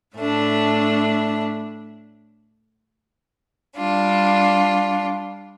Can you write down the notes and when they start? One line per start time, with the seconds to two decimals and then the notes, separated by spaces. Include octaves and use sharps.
0.16 A2 A3 D4
3.77 G3 D4 F4